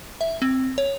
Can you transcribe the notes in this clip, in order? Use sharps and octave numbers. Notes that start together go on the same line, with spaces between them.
E5
C4
C#5